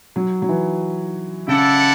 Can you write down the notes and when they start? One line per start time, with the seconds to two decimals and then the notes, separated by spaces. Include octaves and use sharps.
0.16 F#3
0.42 F#3
0.49 E3
1.48 C#3 E4 A4 D5 F#5